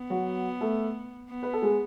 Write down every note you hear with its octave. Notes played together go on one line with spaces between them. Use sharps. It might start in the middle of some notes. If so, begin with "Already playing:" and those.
Already playing: B3
F#3 F#4
A3 A4
B3
B4
A4
G#3 G#4